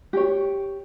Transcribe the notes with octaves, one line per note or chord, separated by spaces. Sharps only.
G4 C#5